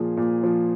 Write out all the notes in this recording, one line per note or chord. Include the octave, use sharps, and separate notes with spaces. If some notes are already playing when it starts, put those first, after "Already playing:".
Already playing: A#2 F3 G#4
A#2
F3